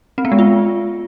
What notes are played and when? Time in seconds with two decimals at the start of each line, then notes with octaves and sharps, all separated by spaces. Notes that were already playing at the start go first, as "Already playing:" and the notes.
0.18 C4
0.25 B3
0.32 G#3
0.39 F4